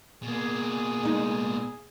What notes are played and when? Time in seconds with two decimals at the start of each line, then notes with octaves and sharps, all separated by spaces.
0.23 B2 A#3 G#4
1.03 G#3 D#4